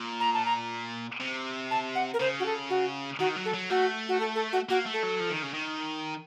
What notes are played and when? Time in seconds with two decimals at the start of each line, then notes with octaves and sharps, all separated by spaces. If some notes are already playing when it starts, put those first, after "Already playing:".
Already playing: A#2
0.20 A#5
0.34 A5
0.45 A#5
1.20 C3
1.71 A5
1.95 F#5
2.14 A#4
2.20 C#3 C5
2.40 F#4
2.46 A4
2.70 F#4
3.19 D#3 F#4
3.36 F#3
3.45 A4
3.54 F#3
3.70 A3 F#4
4.09 F#4
4.20 A4
4.35 A4
4.53 F#4
4.69 A#3 F#4
4.86 A3
4.94 A4
5.03 F#3
5.19 F3
5.30 D#3
5.42 C#3
5.53 D#3